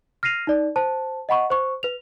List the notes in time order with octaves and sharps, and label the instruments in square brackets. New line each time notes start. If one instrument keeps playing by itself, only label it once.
[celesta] F6 A#6 C7 D#7 F7
D#4 D5
C5 A5
D#5 F#5 B5 C#6
C5 C#6
B4 F7